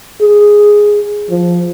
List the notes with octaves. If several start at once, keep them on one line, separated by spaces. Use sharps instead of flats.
G#4
F3